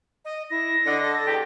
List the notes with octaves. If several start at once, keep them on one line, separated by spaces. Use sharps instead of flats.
D#5
E4 A#6
D3 D#5
A4
E2 G3 G4